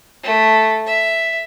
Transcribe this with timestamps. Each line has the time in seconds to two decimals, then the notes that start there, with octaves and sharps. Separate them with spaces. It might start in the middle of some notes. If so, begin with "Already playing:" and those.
0.24 A3
0.86 E5